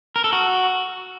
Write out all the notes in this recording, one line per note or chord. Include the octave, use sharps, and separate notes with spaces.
A#4
A4
F#4